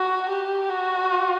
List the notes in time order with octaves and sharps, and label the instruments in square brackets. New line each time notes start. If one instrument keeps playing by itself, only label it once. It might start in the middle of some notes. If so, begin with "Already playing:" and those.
Already playing: [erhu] F#4
G4
F#4